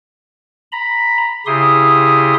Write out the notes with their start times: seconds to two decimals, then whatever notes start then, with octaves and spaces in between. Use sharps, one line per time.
0.72 A#5 B5
1.46 C#3 E4 G4 C6 D#6